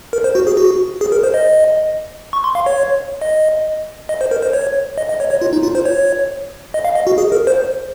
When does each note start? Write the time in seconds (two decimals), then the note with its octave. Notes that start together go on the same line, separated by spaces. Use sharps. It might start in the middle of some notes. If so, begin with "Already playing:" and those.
0.13 A#4
0.24 C5
0.35 F#4
0.47 G#4
0.57 F#4
1.01 G#4
1.12 A#4
1.23 C5
1.34 D#5
2.33 C#6
2.44 C6
2.55 F5
2.66 C#5
3.22 D#5
4.09 D#5
4.21 C5
4.31 A#4
4.42 C5
4.53 C#5
4.98 D#5
5.09 D#5
5.20 C#5
5.31 C#5
5.42 F4
5.53 D#4
5.63 F4
5.75 C5
5.85 C#5
6.74 D#5
6.85 F5
6.95 D#5
7.07 F#4
7.18 G#4
7.32 A#4
7.47 C5